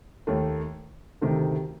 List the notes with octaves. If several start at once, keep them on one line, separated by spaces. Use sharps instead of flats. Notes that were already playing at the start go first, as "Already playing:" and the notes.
D#2 D#3 A3
D2 C3 D#3 A3